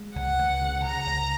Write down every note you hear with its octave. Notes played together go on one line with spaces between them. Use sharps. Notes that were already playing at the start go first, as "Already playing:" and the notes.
Already playing: G#3
C#2 F#5
C#2
C#3
C#3 A#5
C#2